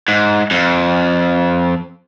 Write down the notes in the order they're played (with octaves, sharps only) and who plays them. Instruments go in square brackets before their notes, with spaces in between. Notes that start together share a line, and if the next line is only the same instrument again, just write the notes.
[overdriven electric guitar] G#2
F2